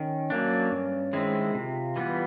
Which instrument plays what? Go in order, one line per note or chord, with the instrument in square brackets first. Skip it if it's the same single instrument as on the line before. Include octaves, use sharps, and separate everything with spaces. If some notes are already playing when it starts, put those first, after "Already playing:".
Already playing: [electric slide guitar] D#3 [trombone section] C#4
[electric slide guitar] F#3 A#3 D4
G2
D#3 G#3 C4 E4
[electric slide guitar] C3 [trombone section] F4
[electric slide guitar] E3 G3 B3